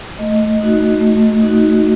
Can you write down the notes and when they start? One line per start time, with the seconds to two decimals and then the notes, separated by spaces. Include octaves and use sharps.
0.19 A3 D#5
0.61 D#4 F#4
1.01 A3
1.43 D#4 F#4